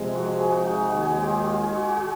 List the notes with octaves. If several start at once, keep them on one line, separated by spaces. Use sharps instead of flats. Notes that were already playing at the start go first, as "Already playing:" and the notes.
Already playing: C3 F3 G#3
F#4
G#4
F#4
D#4
D#2 D#3 G#3 F#4
G#4
F4 F#4
F4
G#4
F#4
F#4
G#4